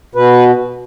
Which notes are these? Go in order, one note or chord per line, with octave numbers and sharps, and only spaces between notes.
B2 B4